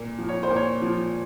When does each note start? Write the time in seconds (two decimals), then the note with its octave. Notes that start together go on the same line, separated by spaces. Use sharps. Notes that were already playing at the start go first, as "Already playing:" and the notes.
Already playing: A#2
0.19 F3
0.29 C#5
0.43 C5
0.50 A#2
0.56 C#5
0.82 F3